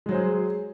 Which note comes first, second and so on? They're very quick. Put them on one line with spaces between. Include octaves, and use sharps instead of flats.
G#3 F#3 C5 G#4